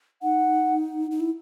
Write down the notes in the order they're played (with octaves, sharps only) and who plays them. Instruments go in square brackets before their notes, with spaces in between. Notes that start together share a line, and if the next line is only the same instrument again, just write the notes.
[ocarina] D#4 [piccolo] F#5
[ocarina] D#4
E4